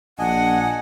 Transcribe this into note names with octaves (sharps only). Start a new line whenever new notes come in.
A#1 D4 D#5 F#5 G#5